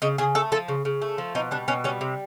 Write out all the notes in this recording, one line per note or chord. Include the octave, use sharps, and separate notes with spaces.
C#3 D#4
C#3 G#4
A3 A4
F3 A4
C#3
C#3
A3
F3
B2 D#4
G3 D4
B2 C#4
G3 C#4
C3